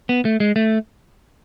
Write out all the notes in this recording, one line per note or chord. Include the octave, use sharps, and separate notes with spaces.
B3
A3
G#3
A3